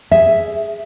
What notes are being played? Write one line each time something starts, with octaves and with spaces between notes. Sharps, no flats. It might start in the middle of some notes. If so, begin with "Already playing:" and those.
G#4 E5